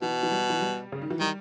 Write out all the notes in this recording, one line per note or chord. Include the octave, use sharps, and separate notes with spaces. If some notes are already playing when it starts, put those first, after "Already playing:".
B2 E3
E3
G3
E3
G3
C#3
D#3
E3
D#3 G3